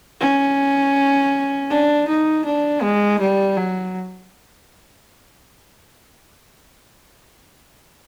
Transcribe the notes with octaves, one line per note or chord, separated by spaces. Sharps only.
C#4
D4
D#4
D4
G#3
G3
F#3